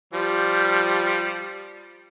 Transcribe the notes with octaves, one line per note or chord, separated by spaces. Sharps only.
F3 G3